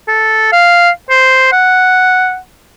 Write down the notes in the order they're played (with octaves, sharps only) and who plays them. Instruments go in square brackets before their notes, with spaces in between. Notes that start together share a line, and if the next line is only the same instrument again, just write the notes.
[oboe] A4
F5
C5
F#5